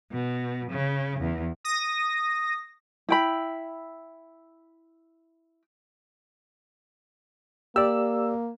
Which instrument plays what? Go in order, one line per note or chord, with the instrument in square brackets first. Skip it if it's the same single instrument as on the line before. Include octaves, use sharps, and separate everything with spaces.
[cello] B2
C#3
E2
[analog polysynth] D#6 A#6
[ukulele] E4 G5 B5
[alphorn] A#3 [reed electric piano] G4 D5 [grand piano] E6